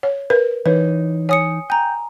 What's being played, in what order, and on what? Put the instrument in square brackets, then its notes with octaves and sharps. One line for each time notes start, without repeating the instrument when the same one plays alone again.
[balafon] C#5
A#4 B4
[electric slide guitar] E3 D#4 [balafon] B4 [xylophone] C#5
[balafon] C#5 [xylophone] G#5 D#6 C#7
[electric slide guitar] G5 [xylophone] G#5 A#5